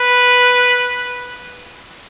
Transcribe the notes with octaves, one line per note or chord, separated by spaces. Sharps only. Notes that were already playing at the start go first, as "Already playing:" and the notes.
Already playing: B4